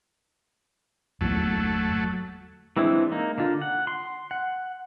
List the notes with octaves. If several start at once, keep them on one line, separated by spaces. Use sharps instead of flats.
G1 E2 F#3 A3 A#3
E3 G#3 C4 D4 E4
A#3 D#4
D3 F4
F#5
C6
F#5